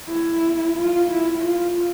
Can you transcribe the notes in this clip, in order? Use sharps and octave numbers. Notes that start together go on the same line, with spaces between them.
E4
F4
E4
F4